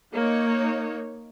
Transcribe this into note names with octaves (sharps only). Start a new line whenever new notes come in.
A#3 D#4 C#5